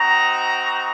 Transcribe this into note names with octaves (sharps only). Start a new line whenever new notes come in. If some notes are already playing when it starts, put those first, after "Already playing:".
Already playing: C4 D#4 F#4 A#5